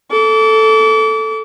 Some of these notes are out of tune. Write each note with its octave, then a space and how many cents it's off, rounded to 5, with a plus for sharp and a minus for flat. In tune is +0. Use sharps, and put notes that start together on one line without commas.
A4 +0 D6 -35